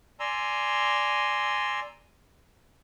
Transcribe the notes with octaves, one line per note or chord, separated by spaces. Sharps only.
D5 G#5 A#5 C6 E6